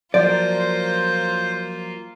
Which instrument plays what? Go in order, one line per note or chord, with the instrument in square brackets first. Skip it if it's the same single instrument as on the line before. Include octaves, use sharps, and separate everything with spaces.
[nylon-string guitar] F3 F#3 [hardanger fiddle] A#3 F4 [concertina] C5 [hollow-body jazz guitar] D5